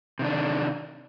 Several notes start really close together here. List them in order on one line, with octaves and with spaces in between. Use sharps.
C3 D#3 D4